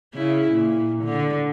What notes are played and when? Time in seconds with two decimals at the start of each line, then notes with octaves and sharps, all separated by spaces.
0.14 C#3 E4
0.52 A#2
1.04 D3